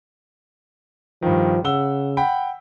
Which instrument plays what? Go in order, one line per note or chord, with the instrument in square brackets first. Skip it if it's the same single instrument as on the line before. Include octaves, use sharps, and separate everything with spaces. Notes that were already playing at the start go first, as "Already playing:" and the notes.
[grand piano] G2 D#3 [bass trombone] F3
[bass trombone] C#3 [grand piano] F#5 E6 G7
[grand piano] F#5 G5 B5